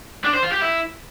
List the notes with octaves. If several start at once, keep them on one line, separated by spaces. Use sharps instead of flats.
D4
C5
F4
G4
E4